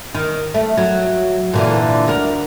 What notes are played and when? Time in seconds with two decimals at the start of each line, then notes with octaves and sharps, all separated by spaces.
0.15 D#3
0.54 A3
0.77 F#3
1.53 A#2 D3 E3
2.08 D2 A#4